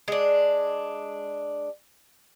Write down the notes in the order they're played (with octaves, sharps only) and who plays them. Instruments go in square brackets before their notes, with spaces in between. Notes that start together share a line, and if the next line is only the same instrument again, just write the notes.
[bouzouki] G#3 D4